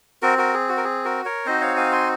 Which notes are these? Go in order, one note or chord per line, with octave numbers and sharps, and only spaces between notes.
C4 F#4 A#4
F#4 A#4
G#4
F#4
A#4
G#4
F#4 A#4
A#4 C#5
C4 D#4 F#4 C5 D#5
C#5 F5
F5 G#5
G#5 C6